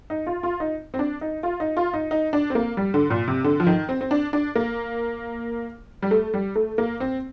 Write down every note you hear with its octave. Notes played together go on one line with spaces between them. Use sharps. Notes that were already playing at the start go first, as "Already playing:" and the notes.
D#4
F4
F4
D#4
C4
D4
D#4
F4
D#4
F4
D#4
D#4
D4
C4
A#3
G3
D3
A#2
C3
D3
F3
D#3
C4
C4
D4
D4
A#3
G3
A3
G3
A3
A#3
C4